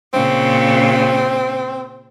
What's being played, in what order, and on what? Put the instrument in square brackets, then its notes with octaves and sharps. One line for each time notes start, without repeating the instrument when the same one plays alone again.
[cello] A#2 C#3 [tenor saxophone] C4